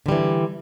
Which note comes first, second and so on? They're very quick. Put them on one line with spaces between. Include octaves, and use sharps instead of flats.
D3 G3 E3